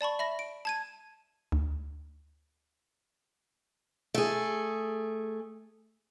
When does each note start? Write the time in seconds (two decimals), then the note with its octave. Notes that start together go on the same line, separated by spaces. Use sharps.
0.01 D5 A5 B5 C#6
0.19 E5 B5 A#6
0.39 D7
0.65 A5 G#6 D#7
1.52 D2
4.14 A3 G#4